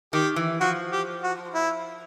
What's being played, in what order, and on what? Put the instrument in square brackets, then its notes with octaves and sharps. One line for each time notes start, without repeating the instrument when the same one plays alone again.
[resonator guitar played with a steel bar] D#3 [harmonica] G4
[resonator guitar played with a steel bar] E3
[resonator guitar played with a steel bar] F3 [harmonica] F#4
[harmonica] G4
F#4
E4